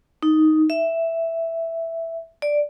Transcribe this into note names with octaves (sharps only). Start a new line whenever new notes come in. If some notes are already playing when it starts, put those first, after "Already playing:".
D#4
E5
D5